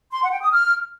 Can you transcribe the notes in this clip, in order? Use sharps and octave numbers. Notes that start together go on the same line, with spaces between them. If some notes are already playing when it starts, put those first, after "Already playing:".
C6
F#5
G5
D#6
F6